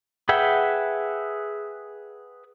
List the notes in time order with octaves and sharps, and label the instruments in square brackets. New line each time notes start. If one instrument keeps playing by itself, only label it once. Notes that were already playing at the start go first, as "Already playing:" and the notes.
[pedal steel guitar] G#4 B4 E5 F#5 G5